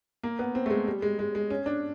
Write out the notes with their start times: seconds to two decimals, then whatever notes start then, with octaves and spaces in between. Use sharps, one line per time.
0.23 A#3
0.39 B3
0.55 C4
0.66 A3
0.70 G#3
0.87 G3
1.02 G#3
1.19 G#3
1.35 G#3
1.50 C#4
1.66 D4